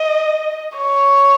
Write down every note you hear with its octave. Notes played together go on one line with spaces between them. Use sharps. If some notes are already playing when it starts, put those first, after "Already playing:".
Already playing: D#5
C#5